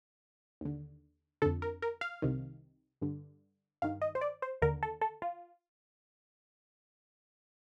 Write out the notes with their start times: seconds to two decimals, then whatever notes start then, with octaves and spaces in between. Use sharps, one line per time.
0.61 D#2 D3
1.42 F2 D3 A4
1.62 A#4
1.82 A#4
2.01 F5
2.22 C2 C3 D#3
3.02 G2 D3
3.82 G2 D#3 F5
4.02 D#5
4.15 C5
4.21 D5
4.42 C5
4.62 D#2 D3 A#4
4.83 A4
5.01 A4
5.22 F4